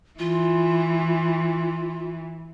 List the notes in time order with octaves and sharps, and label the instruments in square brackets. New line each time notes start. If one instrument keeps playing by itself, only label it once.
[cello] E3 [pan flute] F4